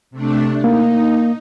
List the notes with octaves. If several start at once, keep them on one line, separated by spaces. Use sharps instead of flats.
C3 A3 D4
A#3 D#4